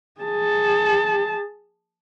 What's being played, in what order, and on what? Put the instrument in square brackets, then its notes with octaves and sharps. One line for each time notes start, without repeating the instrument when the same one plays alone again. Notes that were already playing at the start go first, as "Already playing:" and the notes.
[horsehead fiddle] G#4 A5